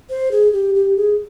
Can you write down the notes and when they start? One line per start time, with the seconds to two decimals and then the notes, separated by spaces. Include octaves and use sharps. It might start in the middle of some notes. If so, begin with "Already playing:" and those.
0.10 C5
0.32 G#4
0.53 G4
0.75 G4
0.96 G#4